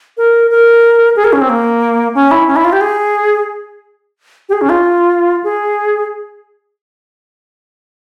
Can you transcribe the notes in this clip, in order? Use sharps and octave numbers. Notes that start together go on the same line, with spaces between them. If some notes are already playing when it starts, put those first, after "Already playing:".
A#4
A#4
G#4
A#4
C#4
C4
A#3
C#4
E4
C#4
E4
F4
G4
G#4
G4
G#4
C#4
F4
G#4